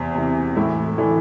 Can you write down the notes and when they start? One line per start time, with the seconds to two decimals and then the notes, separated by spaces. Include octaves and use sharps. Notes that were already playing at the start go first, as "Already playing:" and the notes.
Already playing: E2 C3 C4
0.15 C3 E3
0.56 A2 E3 E4
0.98 D3 E3 D4